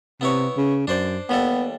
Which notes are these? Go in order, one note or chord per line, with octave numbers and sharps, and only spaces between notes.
C3 B3 E4 C#5
C#3
F#2 D4 C5 D5
D#2 G3 B3 A4